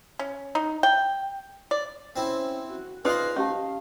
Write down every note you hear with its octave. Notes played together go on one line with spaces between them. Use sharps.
C#4
D#4
G5
D5
C4 C#4 E4
F#4
D#4 F4 G#4 B4 C5 D5 D#5
C#4 G4 D#5 F5 A5